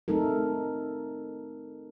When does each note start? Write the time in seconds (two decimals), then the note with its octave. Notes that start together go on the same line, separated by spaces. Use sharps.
0.08 A3 C4 D#4 A4 A#4